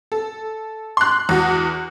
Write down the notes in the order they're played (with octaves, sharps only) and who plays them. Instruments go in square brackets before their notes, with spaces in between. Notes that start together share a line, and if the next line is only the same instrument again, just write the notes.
[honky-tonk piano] A4
C6 F#6
E2 F#4